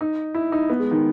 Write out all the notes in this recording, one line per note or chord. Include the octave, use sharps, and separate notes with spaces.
D#4
E4
D#4
B3
G#3
D#3